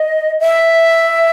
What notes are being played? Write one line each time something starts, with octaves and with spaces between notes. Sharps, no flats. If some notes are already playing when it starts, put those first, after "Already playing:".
Already playing: D#5
E5